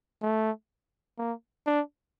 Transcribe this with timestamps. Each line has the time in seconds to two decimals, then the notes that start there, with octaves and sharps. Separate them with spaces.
0.22 A3
1.18 A#3
1.66 D4